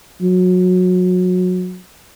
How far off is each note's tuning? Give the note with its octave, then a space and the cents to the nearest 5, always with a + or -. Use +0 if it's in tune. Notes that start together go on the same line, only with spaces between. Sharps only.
F#3 -25